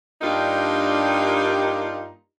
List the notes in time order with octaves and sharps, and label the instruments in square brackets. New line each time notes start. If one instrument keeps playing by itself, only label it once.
[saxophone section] G2 A#3 D4 D#4 F4 G4